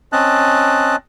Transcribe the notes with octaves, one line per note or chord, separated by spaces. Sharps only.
C4 C#4 D#5 A5 F#6